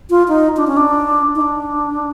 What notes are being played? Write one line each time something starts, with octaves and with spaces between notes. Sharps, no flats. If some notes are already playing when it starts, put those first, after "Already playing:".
F4
D#4
D4
C#4
D4
D#4
D4